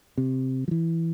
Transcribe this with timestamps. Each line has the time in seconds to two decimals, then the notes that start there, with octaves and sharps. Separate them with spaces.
0.18 C3
0.68 F3
0.71 E3